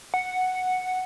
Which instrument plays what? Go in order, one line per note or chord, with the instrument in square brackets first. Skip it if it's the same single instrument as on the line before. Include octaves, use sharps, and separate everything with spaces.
[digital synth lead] F#5